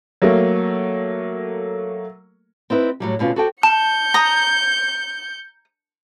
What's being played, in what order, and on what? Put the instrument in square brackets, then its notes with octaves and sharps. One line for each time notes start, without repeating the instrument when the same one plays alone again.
[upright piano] F#3 A3 A#3
[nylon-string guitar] C4 D#4 E4 B4
A2 F#3 G3
D2 B2 C#4 F4
F#4 G4 A4 C5 G5
[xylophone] A5 [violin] G6 C#7
[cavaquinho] A#5 D#6